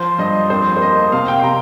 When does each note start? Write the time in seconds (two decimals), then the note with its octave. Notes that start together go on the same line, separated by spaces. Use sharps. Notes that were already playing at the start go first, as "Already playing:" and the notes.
Already playing: F3 C5
0.18 G2 D#5
0.50 F2 C5
0.77 C5
0.81 A#3 D#5
1.12 C3 F5
1.28 G5
1.39 C6
1.44 C3 A#5